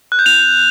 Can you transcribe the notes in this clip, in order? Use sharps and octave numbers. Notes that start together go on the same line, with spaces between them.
F#6
G6
F7